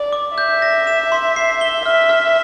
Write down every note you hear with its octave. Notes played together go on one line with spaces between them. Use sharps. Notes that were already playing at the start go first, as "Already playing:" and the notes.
Already playing: D5
D6
E5 G6
A#6
E7
C6
C7
G7
E5 F6
F6